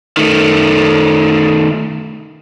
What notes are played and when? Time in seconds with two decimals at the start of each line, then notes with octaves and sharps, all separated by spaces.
0.17 D#3 A3